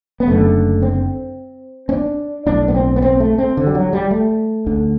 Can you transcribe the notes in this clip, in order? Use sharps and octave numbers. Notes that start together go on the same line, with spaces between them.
B3
F#1 F#2 D3 A3
C4
C4
D4
B1 A2 D4
B3
C4
B3
C4
A3
C4
D3
G3
F#3
G3
A3
D2 D3